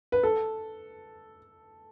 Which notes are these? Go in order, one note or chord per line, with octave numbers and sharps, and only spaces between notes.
B4
A4